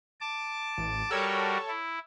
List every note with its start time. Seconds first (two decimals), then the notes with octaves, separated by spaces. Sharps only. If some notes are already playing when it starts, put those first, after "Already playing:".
0.21 A5 D6
0.78 A1
1.11 G3 F#4 A4 A#4 C#5
1.68 E4